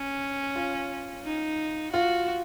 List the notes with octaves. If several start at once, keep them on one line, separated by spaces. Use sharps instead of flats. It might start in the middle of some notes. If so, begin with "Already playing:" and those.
Already playing: C#4
F4
D#4
F4 F#4